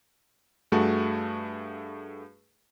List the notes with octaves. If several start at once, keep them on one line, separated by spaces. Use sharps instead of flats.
G2 A3 F#4 G#4 A5